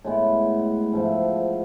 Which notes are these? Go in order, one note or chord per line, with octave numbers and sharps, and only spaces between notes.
A2 G#3 B3
G#2 F3 A3